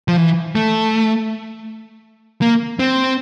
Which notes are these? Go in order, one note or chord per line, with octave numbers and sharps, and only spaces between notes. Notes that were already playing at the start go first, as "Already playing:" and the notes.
F3
E3
A3
A#3
C4